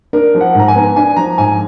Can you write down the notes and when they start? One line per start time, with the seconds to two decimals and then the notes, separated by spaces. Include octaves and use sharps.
0.13 D4 A#4
0.34 F3
0.41 F#5
0.55 G#2 A#5
0.68 G#5
0.75 B3
0.96 D4 G#5
1.16 F3 A#5
1.38 G#2 G#5